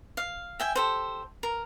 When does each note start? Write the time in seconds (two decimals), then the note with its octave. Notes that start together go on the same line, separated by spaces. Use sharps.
0.17 F5
0.60 E5 G5 G#5
0.75 G4 A4 C5
1.43 A#4